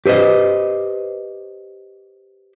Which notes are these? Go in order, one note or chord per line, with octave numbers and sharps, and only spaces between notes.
G4 B4 C5 D#5